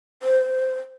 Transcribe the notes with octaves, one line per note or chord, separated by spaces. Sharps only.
C5